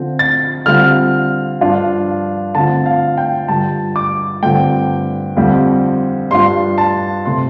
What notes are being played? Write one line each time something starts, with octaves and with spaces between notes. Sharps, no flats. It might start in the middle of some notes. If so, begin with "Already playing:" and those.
Already playing: D3 F3 C4
A6
D3 G3 C4 F4 F6
G2 F3 D4 F4
D3 A3 C4 F4 A5
F5
G5
G2 D3 G3 F4 A5
D6
G2 D3 A3 C4 F4 G5
F2 D3 G3 C4 F4
G2 G3 D4 F4 C6
A5
C3 A3 C6